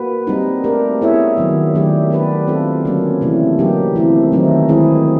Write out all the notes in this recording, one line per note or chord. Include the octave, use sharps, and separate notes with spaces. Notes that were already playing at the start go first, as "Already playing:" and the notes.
Already playing: A#3 F#4 B4
G3 C4 D#4
A3 D4 G4 A#4
B3 E4 G#4 C#5 E5
D#3 F#3 B3
D#3 F#3 A3 D4 G4
B3 D4 G4 B4 D5
C4 F4 A4
D3 F#3 A#3 C#4
C3 E3 A3
D3 F#3 A#3 D#4 G4
E3 A3 C4
D#3 F#3 A3 C4 D#4
D#3 G#3 C4 E4 G#4